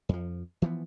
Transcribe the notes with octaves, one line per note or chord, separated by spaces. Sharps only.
F2 F3
E3 F3 A3 B3